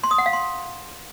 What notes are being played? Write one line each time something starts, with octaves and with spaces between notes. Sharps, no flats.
C6
D#6
F#5
F5
C6